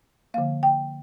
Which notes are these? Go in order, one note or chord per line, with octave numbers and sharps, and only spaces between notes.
D3 F3 A#3 F5
G5